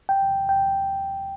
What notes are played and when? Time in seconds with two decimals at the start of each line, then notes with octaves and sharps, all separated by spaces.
0.09 D#2 G5
0.29 D#2
0.49 D#2 G5